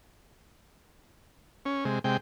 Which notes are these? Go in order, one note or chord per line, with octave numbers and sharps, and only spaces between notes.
C#4
C3 G#3
C3 G#3 G5